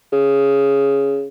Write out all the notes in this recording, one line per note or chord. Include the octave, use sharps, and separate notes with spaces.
C#3